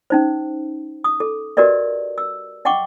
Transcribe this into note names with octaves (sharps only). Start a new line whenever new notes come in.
C#4 D#4 C5
D#6
A4
F#4 G4 A#4 B4 D5 D#5
E6
D#5 F#5 G5 C#6 D6